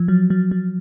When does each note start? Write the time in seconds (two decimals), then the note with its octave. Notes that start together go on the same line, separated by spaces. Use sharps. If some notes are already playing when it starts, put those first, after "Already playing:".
Already playing: F3
0.08 F#3
0.30 F#3
0.51 F#3